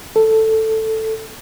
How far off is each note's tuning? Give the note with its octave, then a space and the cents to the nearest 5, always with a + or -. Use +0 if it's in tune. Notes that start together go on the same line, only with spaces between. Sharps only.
A4 +5